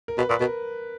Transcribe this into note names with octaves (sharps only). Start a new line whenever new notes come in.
A#4
B2 B4
A#2 B4
B2 A#4